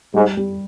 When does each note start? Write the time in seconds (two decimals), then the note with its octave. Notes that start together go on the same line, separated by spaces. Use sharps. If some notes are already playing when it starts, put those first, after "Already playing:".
0.14 G#2 G3
0.37 G3